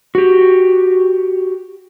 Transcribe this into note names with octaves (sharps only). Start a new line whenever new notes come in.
F#4 G4